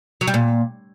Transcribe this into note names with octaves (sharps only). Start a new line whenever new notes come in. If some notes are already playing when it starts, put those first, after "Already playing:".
F#3
G3
A#2